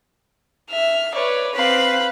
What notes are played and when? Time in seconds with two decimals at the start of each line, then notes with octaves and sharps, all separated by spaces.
0.70 E5 F6
1.15 B4 C#5 D5
1.55 C4 B4 F5 B5